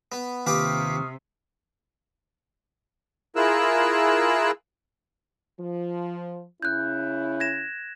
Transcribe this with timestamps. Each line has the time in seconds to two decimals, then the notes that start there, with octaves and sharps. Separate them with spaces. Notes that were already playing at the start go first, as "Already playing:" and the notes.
0.12 B3
0.47 D#2 C3 F4 G4 B4 C#6 D#6 F6
3.36 E4 F4 G#4 A#4 E6 F#6
5.59 F3
6.62 C#3 C#4 E4 F#6 G6
7.40 G#6 A#6 E7